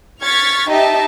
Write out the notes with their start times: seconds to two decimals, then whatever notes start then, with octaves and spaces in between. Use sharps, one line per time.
0.22 C#6 F6 G#6 A6 B6
0.70 D#4 G4 D#5 E5 A5